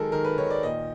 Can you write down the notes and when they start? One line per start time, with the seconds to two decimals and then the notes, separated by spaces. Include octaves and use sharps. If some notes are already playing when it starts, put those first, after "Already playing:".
Already playing: D#3 F#3 G#3 A4 A#4
0.12 D#3 A#4
0.25 B4
0.38 D#3 C#5
0.50 D5
0.63 A#2 D#5